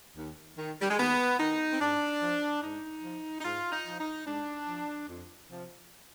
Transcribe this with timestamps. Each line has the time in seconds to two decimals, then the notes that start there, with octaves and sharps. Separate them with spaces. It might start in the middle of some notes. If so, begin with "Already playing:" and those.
0.16 D#2
0.57 D#3
0.82 G3
0.90 G#3
0.99 D#2 B3
1.39 D#3 D#4
1.72 C4
1.80 G#2 D4
2.21 F3
2.63 G#2 D#4
3.03 F3
3.40 D#4
3.44 G#2 F4
3.72 D#4
3.85 F3
3.99 D#4
4.26 G#2 D4
4.67 F3
5.08 F2
5.49 C3 F3